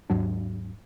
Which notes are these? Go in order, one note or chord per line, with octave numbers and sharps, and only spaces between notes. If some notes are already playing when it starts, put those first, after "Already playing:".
D#2 G#2 F#3 D4